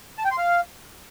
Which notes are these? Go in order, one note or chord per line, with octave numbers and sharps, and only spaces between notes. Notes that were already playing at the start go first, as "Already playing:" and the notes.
A5
G5
C6
F5